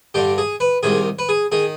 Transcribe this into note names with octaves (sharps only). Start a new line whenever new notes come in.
G2 D3 G4
G#4
B4
C2 C3 D#3 G#4
B4
G#4
D#3 G#4